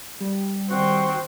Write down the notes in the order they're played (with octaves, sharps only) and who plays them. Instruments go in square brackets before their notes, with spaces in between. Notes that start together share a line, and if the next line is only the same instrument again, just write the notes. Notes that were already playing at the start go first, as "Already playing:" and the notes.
[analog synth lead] G3
[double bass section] D#3 [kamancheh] C4 [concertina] F#4